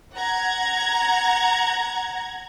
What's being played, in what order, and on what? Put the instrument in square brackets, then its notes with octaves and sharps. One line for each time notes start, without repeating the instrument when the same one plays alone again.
[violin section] F#5 A#5 G#6